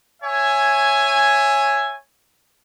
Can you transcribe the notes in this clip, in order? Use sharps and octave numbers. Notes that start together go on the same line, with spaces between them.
C#5 E5 G#5